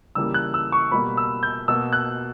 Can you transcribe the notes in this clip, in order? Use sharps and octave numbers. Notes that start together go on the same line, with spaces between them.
C#3 E3 G3 A#3 E6
F#6
E6
C#6
B2 G3 A#3 B5
E6
G6
B2 A#3 E6
F#6